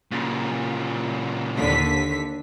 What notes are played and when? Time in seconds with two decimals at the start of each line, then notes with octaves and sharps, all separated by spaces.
0.11 A#2 C#3
1.58 D#2 D3 B6